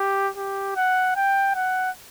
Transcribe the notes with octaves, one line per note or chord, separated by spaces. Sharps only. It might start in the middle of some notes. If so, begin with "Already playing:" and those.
Already playing: G4
G4
F#5
G5
F#5